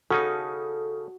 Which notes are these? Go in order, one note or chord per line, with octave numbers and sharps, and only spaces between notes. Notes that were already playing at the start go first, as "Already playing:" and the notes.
C#3 C#4 D#4 F#4 A4